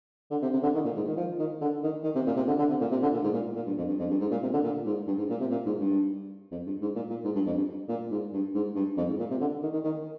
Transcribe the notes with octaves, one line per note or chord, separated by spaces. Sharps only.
D3
C3
C3
D3
D#3
A#2
G#2
D#3
F3
D#3
D3
D#3
D#3
C3
A#2
C3
D3
D3
C3
A#2
C3
D3
A#2
G#2
A#2
A#2
G2
F2
G2
F2
G2
G#2
A#2
C3
D3
A#2
G#2
G2
G#2
A#2
C3
A#2
G#2
G2
F2
G2
G#2
A#2
A#2
G#2
G2
F2
G2
A#2
G#2
G2
G#2
G2
F2
G#2
A#2
C3
D3
D#3
D#3
D#3